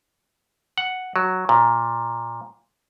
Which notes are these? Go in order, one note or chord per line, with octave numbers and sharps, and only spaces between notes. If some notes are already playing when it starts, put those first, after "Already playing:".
F#5
F#3
A#2